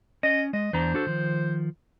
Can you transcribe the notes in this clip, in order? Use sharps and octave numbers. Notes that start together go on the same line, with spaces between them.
C#4 D#5
G#3 D#5
E2 D4 C5 A#5
D4 F#4 A4
D#3 F3